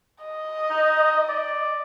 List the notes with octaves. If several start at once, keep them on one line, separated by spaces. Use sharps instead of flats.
D#5
D#4
D5